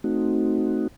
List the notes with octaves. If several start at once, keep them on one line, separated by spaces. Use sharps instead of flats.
A3 C4 D#4 F#4